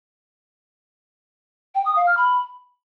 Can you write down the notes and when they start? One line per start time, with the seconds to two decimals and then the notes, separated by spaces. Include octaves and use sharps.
1.75 G5
1.85 D#6
1.96 F5
2.07 F6
2.17 B5